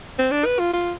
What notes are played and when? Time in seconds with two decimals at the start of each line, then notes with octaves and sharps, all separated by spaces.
0.19 C4
0.31 D4
0.45 B4
0.59 F4
0.73 F4